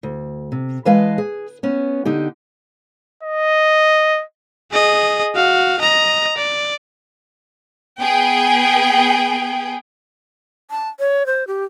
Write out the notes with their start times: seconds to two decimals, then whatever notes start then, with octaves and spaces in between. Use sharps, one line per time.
0.03 D2
0.52 C3
0.85 E3 G#3 B4 D#5 F5 A5
1.18 G#4
1.63 B3 C#4
2.05 D3 D#4 G4
3.23 D#5
4.71 G#4 D#5
5.35 F#4 F5
5.80 D#5 A#5
6.37 D5
8.00 B3 G#4 G5
10.71 A5
10.99 C#5
11.26 C5
11.47 G4